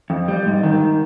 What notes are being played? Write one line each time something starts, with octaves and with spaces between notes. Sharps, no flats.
F2
G3
G#2
D#3